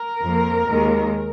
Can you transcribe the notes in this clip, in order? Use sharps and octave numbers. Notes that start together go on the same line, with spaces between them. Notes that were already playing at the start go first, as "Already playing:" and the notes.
Already playing: A#4
F2 F3 A#3
D#2 D#3 G#3